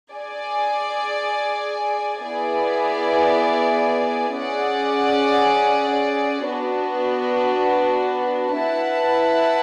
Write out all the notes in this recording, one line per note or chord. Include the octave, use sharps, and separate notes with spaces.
G#4 D5 G#5
B3 E4 G#4 D5 G#5
C#4 G#4 D5 F#5
B3 D4 F#4
E4 B4 F#5 A5